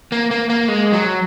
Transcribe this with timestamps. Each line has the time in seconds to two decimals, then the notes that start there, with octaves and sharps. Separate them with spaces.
0.12 A#3
0.31 A#3
0.49 A#3
0.68 G#3
0.93 F#3